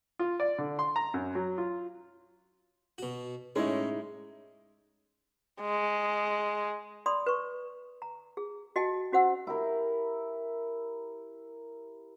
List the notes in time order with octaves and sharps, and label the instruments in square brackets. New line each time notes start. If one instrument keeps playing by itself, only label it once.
[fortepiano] F4
D5
D3
C6
A#5
F#2
F#3
F4
[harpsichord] B2 F#4
[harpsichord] A2 C#4 [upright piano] G#3 D#4 E4
[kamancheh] G#3
[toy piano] D5 B5 C6 D#6
B4 C#6
A#5
G#4
F#4 D#5 G5 A5
C#4 F#4 C5 F#5 E6
[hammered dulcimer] E4 G4 A#4